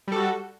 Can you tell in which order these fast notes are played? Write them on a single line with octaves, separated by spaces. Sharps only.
G3 A4 F#4